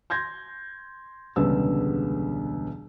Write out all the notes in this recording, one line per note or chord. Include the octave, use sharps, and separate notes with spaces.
C6 G6 G#6 A#6
E1 C#2 D3 G3 B3 E6